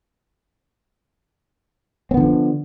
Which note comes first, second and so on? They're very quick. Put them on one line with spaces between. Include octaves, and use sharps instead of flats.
C4 B3 D3 F3